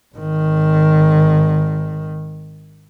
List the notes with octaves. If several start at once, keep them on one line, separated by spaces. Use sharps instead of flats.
G#1 D#3